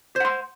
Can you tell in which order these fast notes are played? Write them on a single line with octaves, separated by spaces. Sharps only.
C5 F#5 C6